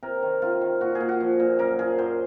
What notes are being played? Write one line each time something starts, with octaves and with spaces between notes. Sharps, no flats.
C3 A#4
D#3
C3 F4
D#3
A#2 F#4
G#4
A#2
F#4
F3
A#2
F#2 A#4
F3 G#4
F#2 C5